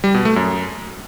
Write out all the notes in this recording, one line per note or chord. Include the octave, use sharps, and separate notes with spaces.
G3
B2
A3
F#2